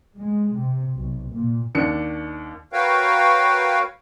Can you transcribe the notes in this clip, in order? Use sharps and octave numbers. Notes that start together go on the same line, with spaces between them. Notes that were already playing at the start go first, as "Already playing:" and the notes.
G#3
C3
B1
A#2
D#2 D4 C#7
F#4 A#4 B4 C#5 F5 G5